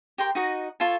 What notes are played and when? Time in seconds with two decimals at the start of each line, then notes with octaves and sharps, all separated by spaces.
0.18 G4 A#4 G5 C6
0.35 D#4 F#4 D#5
0.80 F4 A4 C#5 A5